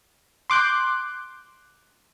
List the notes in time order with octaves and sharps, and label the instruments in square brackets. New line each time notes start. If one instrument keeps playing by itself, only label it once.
[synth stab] C6 D6 F#6 G6